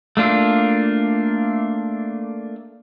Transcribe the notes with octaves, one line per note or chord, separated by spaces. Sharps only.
A3 A#3 D4 F4